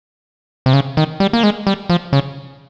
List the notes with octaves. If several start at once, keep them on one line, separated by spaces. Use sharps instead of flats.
C3
C#3
D#3
G3
A#3
G#3
G3
F3
C#3